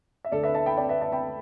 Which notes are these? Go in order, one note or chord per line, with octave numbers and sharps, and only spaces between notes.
E5
D2 D3 A4 D5
B4 E5
E5 A5
G5 B5
D5 G5
B4 E5
E5 A5
G5 B5